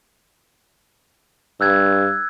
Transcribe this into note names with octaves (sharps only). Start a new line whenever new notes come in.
G2 E6 F#6 G#6